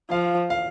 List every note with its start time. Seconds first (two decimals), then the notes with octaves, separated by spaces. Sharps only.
0.11 F3 F5
0.50 F5